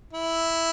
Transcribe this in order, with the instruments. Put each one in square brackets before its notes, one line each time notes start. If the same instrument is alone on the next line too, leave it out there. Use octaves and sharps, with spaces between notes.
[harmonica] E4